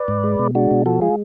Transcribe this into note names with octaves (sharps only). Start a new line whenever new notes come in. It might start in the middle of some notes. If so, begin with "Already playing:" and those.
Already playing: B4 D5
G#2
G#3
B2
G#3 D4 F#4
B2
F3 F#4 A4
G#3 F4 G#4